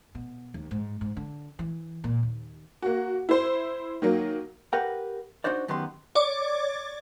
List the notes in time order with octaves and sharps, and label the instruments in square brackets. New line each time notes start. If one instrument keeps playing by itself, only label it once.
[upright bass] B2
D#2
G#2
G#2
D3
E3
A#2
D#2
[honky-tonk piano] A#3 F#4
E4 C5
D#3 F#3 A#3
[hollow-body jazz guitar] G4 A#4 B4 F#5 G5
D4 D#4 F#4 C5 D5
F#2 D#3 B3 G4 C6
[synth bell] C#5 D5 D6